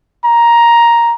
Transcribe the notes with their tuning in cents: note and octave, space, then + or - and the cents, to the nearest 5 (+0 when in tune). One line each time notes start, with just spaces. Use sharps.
A#5 +10